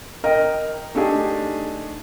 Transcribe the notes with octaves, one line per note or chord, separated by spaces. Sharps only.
A#4 D#5 G5
A3 D4 D#4 G4 G#4